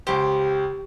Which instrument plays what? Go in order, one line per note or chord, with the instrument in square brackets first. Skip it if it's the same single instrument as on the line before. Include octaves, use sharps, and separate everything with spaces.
[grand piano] C#2 C5 [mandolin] G4